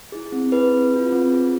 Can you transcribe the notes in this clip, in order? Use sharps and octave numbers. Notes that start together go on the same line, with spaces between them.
E4 G#4
C4
E4 G#4 B4
C4
F4 G#4
C4
F4 G#4